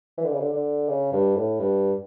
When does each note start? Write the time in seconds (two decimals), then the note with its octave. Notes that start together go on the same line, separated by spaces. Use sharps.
0.18 E3
0.25 D3
0.32 C#3
0.40 D3
0.53 D3
0.89 C#3
1.12 G2
1.36 A2
1.60 G2